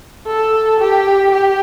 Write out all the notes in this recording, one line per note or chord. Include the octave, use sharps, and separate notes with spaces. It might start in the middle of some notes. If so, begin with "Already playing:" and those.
A4
G4
G4